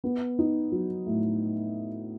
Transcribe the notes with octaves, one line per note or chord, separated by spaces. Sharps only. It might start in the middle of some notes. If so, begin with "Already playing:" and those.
B3
D#4
F#3
A2